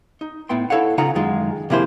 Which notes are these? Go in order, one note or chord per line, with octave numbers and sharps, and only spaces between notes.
D#4
A2 B3 E4 G5 C6
E4 A4 C#5 F5 F#5
C#3 D#4 F4 F#5 A#5
F#2 D#3 G#3 F4
C3 F3 A#3 E4 G#4 C5